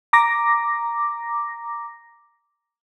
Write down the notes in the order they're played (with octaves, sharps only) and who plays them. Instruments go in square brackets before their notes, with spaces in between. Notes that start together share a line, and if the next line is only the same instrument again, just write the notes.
[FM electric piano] A#5 D6 A#6